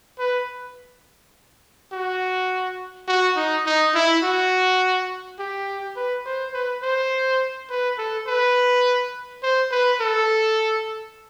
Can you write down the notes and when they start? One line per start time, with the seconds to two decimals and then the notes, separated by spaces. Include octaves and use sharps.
0.19 B4
1.92 F#4
3.08 F#4
3.36 D#4
3.66 D#4
3.95 E4
4.23 F#4
5.39 G4
5.96 B4
6.26 C5
6.54 B4
6.83 C5
7.70 B4
7.98 A4
8.27 B4
9.43 C5
9.71 B4
10.00 A4